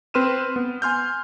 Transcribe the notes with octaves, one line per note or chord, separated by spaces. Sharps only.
C4 B4 C6 F6 D#7 E7
B3
G#5 C6 F6 G6